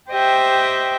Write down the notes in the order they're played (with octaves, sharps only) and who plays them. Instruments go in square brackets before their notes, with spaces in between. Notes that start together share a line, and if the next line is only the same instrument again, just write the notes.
[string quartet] G4 C5 D#5 E5 G5